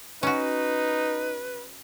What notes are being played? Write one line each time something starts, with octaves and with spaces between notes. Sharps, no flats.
C#4 D#4 F#4 B4